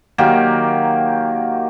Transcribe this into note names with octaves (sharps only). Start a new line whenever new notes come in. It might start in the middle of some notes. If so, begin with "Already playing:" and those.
D#3 F#3 A#3 G4